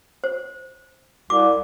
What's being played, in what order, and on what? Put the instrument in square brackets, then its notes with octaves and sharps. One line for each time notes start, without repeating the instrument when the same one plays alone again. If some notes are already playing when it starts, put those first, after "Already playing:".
[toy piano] C5
[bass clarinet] C2 [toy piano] D6